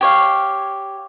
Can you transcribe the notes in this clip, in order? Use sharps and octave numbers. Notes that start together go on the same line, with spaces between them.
G4 C#5 F5